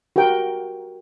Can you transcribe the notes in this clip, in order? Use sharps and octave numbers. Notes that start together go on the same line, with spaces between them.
F#4 G4 A#4 G5